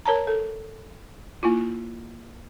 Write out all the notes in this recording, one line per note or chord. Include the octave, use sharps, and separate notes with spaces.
A#4 C#5 A5 A#5
A4
A#3 E4 F4